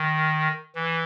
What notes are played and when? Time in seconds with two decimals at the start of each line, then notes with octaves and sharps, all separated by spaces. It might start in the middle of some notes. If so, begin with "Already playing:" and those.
Already playing: D#3
0.76 E3